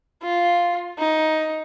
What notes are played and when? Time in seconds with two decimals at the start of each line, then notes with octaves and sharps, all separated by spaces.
0.22 F4
0.99 D#4